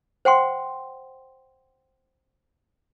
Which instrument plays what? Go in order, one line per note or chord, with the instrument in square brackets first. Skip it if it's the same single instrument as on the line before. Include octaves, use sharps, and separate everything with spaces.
[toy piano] C5 F#5 G5 C6